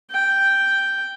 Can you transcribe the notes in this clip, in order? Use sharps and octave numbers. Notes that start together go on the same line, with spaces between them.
G5